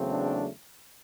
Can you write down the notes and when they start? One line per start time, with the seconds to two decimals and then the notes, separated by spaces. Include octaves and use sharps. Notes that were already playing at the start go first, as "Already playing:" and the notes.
Already playing: E2 C#3 F#3 A3 C4
0.09 D4